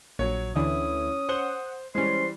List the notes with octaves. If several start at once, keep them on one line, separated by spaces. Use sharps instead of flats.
A#1 F#3 C#5
D2 D3 E3 C#4 E4 D#6
C5 F#5 G7
E3 G3 G#3 C#4 C5 C6